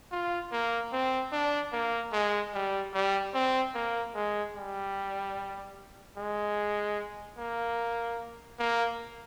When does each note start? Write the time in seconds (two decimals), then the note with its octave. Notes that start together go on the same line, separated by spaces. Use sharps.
0.11 F4
0.52 A#3
0.92 C4
1.32 D4
1.72 A#3
2.12 G#3
2.54 G3
2.94 G3
3.34 C4
3.75 A#3
4.15 G#3
4.56 G3
6.17 G#3
7.38 A#3
8.59 A#3